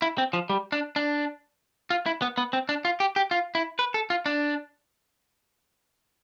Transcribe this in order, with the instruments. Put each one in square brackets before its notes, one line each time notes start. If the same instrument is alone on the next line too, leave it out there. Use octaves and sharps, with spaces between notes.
[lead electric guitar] E4
C4
F3
G3
D4
D4
F4
E4
B3
B3
C4
D4
F4
G4
G4
F4
E4
B4
A4
F4
D4